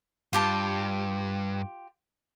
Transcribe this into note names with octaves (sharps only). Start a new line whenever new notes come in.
G2 F4 G4 A5